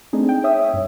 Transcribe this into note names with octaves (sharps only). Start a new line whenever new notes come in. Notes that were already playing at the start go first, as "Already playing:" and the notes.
A3 C4 D4 D#4 G#4
G5
C#5 E5 D#6
G2